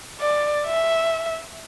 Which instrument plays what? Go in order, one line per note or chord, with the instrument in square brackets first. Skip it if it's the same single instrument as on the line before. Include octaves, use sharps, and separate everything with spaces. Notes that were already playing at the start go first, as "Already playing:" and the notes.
[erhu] D5
E5